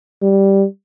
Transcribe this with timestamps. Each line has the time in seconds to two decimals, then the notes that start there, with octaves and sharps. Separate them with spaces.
0.22 G3